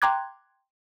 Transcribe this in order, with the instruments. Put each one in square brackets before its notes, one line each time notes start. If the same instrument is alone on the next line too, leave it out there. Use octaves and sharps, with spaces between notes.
[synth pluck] G5 A#5 C6 D6 F#6 G#6